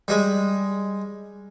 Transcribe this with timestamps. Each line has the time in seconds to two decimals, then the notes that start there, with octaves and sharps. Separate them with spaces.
0.08 G3 G#3